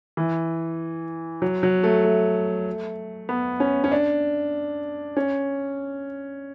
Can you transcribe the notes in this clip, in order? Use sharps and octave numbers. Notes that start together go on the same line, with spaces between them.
E3
F#3
F#3
A3
A3
B3
C#4
C#4
D4
C#4